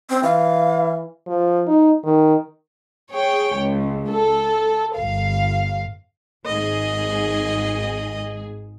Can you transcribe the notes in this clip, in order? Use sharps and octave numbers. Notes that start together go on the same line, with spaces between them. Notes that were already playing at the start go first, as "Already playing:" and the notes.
C4
E3 F5
F3
D#4
D#3
G#4 C#5 G5
C#2
A4
G1 F5
G#1 G#2 G#4 D#5